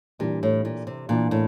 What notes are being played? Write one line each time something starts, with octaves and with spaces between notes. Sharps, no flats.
A#2 E3 G3 D4
A2
A#2
C3
A#2 E3 A#3 D4 F4
A2